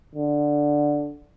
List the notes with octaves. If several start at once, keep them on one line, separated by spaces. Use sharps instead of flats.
D3